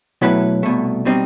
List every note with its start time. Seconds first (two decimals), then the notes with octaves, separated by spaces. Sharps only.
0.22 B2 F#3 A3 E4 B4
0.63 C2 B2 A3
1.05 B2 G3 C4 D#4